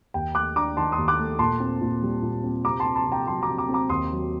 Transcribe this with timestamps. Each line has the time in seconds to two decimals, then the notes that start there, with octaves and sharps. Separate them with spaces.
0.14 D#2 G5
0.35 A3 D6 F#6
0.56 D4 A#5 D6
0.77 D#3 A5 C6
0.92 C6 D#6
0.98 D#2
1.08 D6 F#6
1.19 A3
1.39 A#2 A5 C6
1.60 C4
1.81 A#2
2.02 G3
2.22 A#2
2.44 C4
2.65 C3 A#5 D6
2.80 A5 C6
2.85 C4
2.96 A5 C6
3.06 C3
3.12 G5 A#5
3.27 F#3 A5 C6
3.43 A#5 D6
3.48 C3
3.58 A#5 D6
3.69 C4
3.74 A#5 D6
3.89 D#2 C6 D#6
4.11 F#3